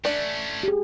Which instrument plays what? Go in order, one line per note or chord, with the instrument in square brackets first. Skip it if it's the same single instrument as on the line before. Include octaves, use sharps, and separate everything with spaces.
[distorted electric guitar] A3 C#4 [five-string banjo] D4 D5
[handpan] G4 G#4